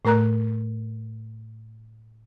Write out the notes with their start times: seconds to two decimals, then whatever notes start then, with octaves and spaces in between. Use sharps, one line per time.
0.05 A2 A3 A#4 A#5 F#6